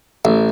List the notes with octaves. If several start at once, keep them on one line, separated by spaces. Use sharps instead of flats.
A1